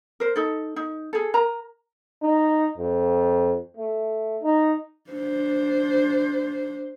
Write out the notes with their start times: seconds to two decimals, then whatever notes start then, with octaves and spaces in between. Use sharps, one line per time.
0.20 A#4 C5
0.36 D#4 A4
0.76 D#4
1.13 G#4 A4
1.34 A#4 A#5
2.22 D#4
2.78 F2
3.77 A3
4.43 D#4
5.11 D4 C5